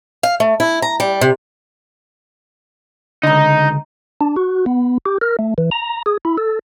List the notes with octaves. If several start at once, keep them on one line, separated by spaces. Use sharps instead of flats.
F5
A3
E4
A#5
G3
C3
C#2 D3 D#4 D#5 A#5
D4
F#4
B3
G4
A#4
A3
E3
A#5
G#4
E4
A4